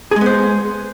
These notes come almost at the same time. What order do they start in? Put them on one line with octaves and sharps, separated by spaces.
G#4 G#3 B3 C5